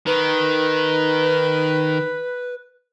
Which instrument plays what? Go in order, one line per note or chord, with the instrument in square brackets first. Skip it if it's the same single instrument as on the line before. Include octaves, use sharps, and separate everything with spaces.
[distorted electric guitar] D#3 [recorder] B4